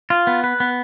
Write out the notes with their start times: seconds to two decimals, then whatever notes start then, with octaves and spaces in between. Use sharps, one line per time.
0.10 F4
0.27 B3
0.44 B4
0.60 B3